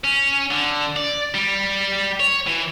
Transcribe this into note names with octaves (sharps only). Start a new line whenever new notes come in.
C#4
D3
D5
G3
C#5
E3